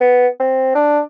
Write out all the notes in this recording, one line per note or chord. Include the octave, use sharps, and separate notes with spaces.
B3
C4
D4